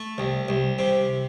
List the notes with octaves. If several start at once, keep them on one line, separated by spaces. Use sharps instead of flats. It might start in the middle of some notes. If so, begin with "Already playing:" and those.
Already playing: A3
C2
C2
C3